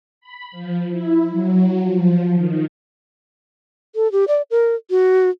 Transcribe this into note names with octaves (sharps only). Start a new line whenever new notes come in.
B5
F3
E4
F#3
F3
D#3
A4
G4
D5
A#4
F#4